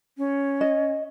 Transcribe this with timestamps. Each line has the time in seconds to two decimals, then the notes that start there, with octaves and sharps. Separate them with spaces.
0.18 C#4
0.61 D#5